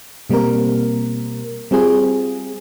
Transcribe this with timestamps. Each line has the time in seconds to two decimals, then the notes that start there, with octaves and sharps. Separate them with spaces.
0.30 B2 G3 A#3 C4 A#4
1.71 G3 C4 F4 G#4